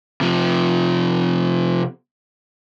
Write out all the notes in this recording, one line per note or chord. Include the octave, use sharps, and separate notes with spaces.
C3 F3